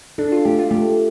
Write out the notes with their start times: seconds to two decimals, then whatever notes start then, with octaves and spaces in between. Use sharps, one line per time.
0.18 D4 A4
0.32 F4
0.45 A3 G4
0.59 F4
0.71 A3 G4